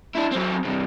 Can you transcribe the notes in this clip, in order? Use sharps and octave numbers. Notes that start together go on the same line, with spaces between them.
D4 E4
F#3 C4
G2 C3